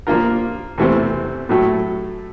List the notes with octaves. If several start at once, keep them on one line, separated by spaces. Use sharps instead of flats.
F3 A#3 D4 F4 A#4
E2 C3 E3 A3 C4
A2 F#3 A3